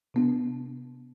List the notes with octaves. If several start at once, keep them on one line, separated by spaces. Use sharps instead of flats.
C3 B3 D4